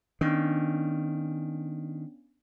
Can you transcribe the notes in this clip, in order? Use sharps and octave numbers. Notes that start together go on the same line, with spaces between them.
D#3 B3 C#4 D4